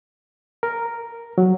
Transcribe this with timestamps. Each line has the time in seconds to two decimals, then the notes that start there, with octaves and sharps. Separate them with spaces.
0.63 A#4
1.38 F#3